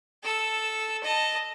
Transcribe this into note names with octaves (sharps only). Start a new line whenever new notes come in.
A4 E6
D#5 A5